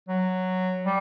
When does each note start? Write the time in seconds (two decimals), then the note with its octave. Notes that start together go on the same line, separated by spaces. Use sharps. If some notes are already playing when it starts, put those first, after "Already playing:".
0.09 F#3
0.85 G3